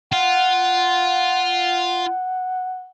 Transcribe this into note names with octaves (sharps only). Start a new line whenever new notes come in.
F4 F#5